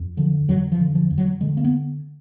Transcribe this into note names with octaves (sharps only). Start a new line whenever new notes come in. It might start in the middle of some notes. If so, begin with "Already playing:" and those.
Already playing: F2
D3 F3
F2 F#3
F3
D3
F3
F2
F#3
D3 G#3
A#3
B3